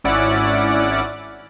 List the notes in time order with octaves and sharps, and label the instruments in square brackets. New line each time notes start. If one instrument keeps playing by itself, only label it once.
[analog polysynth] G#1 C#4 E4 D5 F#5